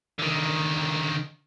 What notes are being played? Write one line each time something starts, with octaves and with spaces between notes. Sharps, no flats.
D3 D#3